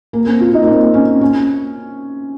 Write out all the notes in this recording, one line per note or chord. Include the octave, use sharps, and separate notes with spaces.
A#3
C4
F4
D#4
A#3
C4
C#4
C#4